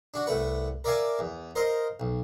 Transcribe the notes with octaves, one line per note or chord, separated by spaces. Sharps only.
D4 F#4
C2 A3 B4 F#5
A#4 D5 E5 F5 G#5 A5
E2
A#4 C5 D#5 F5
B1